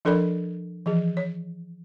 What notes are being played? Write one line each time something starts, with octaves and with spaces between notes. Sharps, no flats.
F3 D4 A4 A#4 D5 B5
E3 F3 G#4
C#5